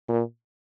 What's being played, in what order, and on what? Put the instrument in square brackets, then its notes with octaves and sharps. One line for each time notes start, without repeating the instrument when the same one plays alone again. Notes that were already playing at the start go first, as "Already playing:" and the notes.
[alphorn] A#2